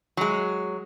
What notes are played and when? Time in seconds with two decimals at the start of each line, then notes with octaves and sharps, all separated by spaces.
0.17 F#3 G#3